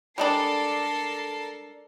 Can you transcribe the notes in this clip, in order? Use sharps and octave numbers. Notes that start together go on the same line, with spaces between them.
G3 G#3 D4 A4 A#4 C7